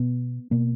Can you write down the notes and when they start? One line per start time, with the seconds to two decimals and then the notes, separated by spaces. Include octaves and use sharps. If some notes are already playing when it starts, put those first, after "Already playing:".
Already playing: B2 B3
0.51 B2 A#3